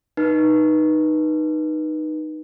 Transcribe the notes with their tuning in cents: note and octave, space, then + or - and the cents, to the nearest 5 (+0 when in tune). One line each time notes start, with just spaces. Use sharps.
D#4 -10 B4 -25